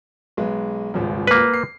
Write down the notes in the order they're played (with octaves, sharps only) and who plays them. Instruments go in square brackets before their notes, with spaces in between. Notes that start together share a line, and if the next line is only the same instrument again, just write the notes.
[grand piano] B1 G#3 B4
D#1 G#1 C#2
[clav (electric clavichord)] A#3 B4
[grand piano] C7